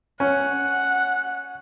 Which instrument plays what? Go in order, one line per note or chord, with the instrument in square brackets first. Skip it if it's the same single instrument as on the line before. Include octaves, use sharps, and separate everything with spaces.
[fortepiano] C#4 [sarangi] F#5